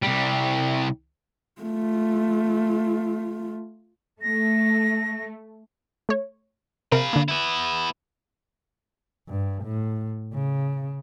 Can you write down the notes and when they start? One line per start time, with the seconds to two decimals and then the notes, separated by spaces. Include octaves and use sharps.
0.03 C2 G3
1.61 A3 F4
4.22 A3 A#6
6.09 A3 C#5
6.92 C3 A#4 F5 B5
7.13 D3 A#3
7.28 B3 E4
9.28 G2
9.64 A2
10.33 C#3